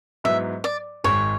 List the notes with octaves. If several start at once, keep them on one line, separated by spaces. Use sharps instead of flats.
G#2 F#3 B3 E4 E5
D5
G#1 G#2 G#3 C#5